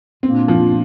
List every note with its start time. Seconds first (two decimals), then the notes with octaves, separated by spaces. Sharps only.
0.23 A#2 A#3 C4 D4 F4
0.48 F3